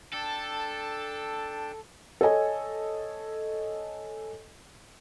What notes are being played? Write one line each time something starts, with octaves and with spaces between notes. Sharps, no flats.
D4 A4 G5 A5
A4 C#5 D#5 G#5